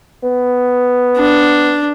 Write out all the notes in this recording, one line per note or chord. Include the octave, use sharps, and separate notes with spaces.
B3
D4